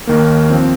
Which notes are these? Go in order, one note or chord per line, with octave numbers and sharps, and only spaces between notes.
D#2 D#3 A#3
F3 C4